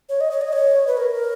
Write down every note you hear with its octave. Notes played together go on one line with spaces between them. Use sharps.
C#5
D#5
C#5
D#5
C#5
B4
A#4